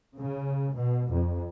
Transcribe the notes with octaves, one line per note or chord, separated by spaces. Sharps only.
C#3
B2
F2